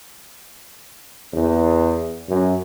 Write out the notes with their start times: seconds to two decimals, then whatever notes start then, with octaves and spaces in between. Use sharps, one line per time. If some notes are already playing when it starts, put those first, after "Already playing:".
1.33 E2
2.29 F#2